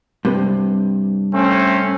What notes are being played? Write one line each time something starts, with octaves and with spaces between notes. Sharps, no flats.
G2 C3
A3 C4 C#4